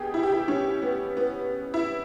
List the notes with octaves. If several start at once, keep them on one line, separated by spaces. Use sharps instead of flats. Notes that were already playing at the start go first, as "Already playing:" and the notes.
Already playing: B2 G4 G#4
E4
G4
E4
C#4
B3
B3
E4